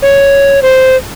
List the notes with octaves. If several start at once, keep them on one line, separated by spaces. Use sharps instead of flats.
C#5
C5